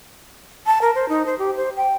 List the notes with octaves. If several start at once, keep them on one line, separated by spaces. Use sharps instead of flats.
A5
A#4
C5
D#4
C5
G4
C5
G5